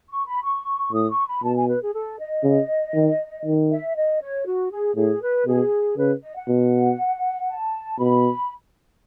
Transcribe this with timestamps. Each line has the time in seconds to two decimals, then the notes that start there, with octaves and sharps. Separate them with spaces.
0.09 C#6
0.26 B5
0.43 C#6
0.92 A2 D#6
1.10 C#6
1.27 B5
1.43 B2 A5
1.56 G#5
1.68 B4
1.82 G#4
1.94 A4
2.19 D#5
2.44 C#3
2.94 D#3
3.45 D#3
3.71 E5
3.95 D#5
4.21 C#5
4.46 F#4
4.71 G#4
4.96 A2 G#4
5.22 B4
5.47 B2 G#4
5.97 C#3 B4
6.22 D#5
6.36 F#5
6.48 B2
7.49 A5
7.99 B2 B5